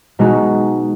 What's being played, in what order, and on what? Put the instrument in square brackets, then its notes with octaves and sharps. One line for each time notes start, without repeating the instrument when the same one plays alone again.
[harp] B2 G#3 D#4 F#4